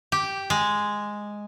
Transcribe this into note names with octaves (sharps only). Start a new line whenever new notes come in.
G4
G#3